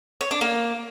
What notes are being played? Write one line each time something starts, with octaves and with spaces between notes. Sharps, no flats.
C#5
D4
A#3